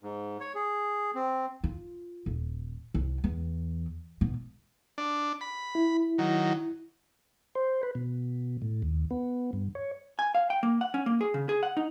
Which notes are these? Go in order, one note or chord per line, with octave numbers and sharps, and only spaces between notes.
G#2
C#5
G#4
C4
F4
D#1
C2
E2
B2
D4
B5
E4
D#3 F#3
C5
B4
B2
A2
D#2
B3
G2
C#5
G#5
F5
G5
A#3
F#5
C#4
A#3
G#4
C#3
G#4
F#5
D#4